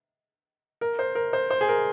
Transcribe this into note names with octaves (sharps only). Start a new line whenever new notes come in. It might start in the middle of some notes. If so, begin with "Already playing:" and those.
A#4
C5
A#4
C5
C5
G#4
A#4